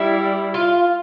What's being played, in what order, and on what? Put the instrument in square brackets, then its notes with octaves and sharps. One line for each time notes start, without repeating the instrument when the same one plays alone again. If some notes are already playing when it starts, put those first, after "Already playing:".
Already playing: [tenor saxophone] G3 [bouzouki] E4
[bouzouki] F4